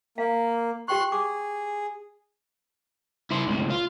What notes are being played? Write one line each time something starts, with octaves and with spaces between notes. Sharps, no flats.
A#3 F5
G4 G5 C6 C#6 F#6
G#4 D6
E4 C5
C#2 A2
F4